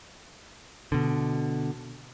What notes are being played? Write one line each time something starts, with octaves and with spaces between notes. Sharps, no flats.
B2 D3